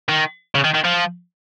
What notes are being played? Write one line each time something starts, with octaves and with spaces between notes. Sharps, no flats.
D#3
C#3
D#3
D#3
F3